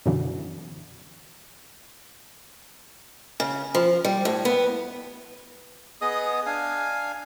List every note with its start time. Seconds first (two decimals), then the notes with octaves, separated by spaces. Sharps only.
0.06 F#2 B2 D3 E3
3.40 C#3
3.75 F3
4.05 G3
4.25 A2
4.45 B3
6.01 B3 G#4 D#5 D#6
6.46 D4 F5 G#5